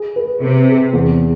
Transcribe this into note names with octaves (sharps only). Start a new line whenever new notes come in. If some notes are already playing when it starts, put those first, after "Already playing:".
Already playing: G#4
B4
C3 B4
G#4
E2